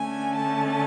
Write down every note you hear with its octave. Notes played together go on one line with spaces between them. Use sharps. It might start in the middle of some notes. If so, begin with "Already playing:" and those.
Already playing: D3 A3 C#4 G#5
A5